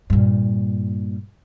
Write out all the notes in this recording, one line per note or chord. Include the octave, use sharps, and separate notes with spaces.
G2 A#2